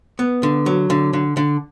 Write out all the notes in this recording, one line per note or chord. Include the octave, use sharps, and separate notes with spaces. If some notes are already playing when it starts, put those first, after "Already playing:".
B3
D3
F#3
D3
D3
D3